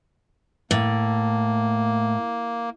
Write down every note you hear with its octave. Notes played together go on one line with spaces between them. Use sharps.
A2 A#3